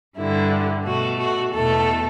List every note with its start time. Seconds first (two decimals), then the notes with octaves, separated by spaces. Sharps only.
0.17 G2 D3 G3 E4
0.86 B2 A3 F#4
1.19 F#4
1.53 E2 B2 A3 A4